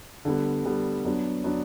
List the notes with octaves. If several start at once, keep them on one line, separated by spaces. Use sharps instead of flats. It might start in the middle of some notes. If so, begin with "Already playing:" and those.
D3 G3 B3
D3 G3 B3
F#3 B3 D4
F#3 B3 D4